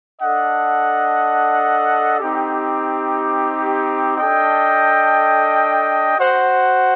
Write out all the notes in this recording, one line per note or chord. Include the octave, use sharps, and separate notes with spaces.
D4 A4 D#5 F#5
C4 D#4 G4
D4 A4 D#5 G5
F#4 C5 F#5